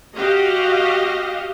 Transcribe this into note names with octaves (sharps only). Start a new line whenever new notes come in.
F#4 G4 D#5 F5